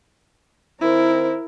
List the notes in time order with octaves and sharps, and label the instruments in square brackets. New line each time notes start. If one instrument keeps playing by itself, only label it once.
[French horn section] D#3 C4 C5 [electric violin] E4 A#4